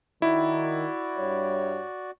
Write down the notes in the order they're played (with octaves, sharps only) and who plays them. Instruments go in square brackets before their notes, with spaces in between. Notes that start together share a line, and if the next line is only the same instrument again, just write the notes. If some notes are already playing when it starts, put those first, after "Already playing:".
[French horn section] D#3 [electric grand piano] E4 [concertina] F#4 D5
[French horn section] G2 G3 C#5